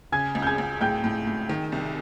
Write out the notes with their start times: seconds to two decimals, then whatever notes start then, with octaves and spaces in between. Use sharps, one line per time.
0.12 C#3 G#5 G#6
0.35 C#2
0.42 G6
0.46 G#5 G#6
0.58 C#2
0.81 A2 G5 G6
1.04 A2
1.27 A2
1.49 D#3
1.72 C2